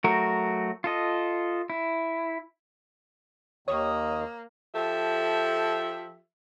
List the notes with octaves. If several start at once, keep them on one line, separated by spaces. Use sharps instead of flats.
F#3 A3 F#4 A#4
F4 A4 D#5
E4
D#2 D#3 A#3 C#5 D#6
F3 G4 A4 E5